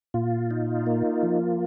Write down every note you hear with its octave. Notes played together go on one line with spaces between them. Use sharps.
A#2 F4
D#4
A#3
F3